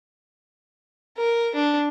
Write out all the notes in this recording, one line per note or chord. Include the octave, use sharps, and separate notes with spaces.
A#4
D4